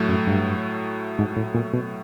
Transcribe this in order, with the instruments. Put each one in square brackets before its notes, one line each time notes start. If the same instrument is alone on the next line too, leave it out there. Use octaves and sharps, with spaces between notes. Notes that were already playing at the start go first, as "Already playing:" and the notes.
Already playing: [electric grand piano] A2 F#3 A3
[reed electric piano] F#2
G2
G#2
A2
A#2
B2